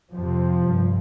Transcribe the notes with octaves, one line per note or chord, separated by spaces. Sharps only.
F2 C3 F3
G2